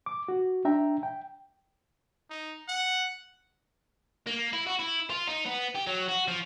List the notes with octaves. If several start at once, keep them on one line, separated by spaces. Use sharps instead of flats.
D6
F#4
D4 E5 G5 A#5
G5
D#4
F#5
A#3
E4
F#4
E4
F4
D#4
B3
G4
F#3
F#4
F3